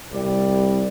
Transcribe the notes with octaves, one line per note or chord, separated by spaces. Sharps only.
C2 G3 D5